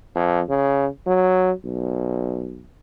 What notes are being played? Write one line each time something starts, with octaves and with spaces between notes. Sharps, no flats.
F2
C#3
F#3
B1